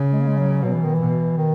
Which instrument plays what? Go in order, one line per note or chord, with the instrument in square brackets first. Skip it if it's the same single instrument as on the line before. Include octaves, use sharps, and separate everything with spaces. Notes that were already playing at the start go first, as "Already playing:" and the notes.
Already playing: [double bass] C#3
[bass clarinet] G#3
A#3
G#3
F#3
[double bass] B2 [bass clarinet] F#3
[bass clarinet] E3
D#3
E3
[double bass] B2
[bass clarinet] D#3